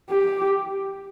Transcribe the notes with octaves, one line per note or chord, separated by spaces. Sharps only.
G4